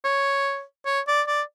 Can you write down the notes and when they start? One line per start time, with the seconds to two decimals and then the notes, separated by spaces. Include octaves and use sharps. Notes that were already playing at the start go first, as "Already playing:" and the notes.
0.05 C#5
0.86 C#5
1.08 D5
1.27 D5